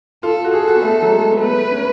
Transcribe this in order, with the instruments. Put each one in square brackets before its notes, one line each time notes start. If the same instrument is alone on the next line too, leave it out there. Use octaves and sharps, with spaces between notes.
[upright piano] F4 [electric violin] A4
[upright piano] F#4
[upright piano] G#4 [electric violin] A4
[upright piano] F#4
B3
A3
F#3
G#3
B3
[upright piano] A3 [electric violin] B4
[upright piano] B3
C#4